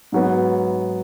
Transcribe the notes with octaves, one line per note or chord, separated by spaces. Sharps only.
G#2 F#3 B3